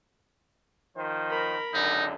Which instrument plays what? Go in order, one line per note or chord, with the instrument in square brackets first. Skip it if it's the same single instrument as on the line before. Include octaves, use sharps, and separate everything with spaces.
[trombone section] D#3 F3 C5
[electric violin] A#4 B5
[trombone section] C#2 F#2 D3 [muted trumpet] D#4